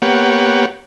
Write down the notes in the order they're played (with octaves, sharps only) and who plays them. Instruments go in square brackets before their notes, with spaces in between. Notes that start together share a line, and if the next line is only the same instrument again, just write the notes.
[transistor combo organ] A#3 B3 G4 C#5 F#5